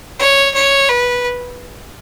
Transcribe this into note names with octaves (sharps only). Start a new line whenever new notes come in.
C#5
C#5
B4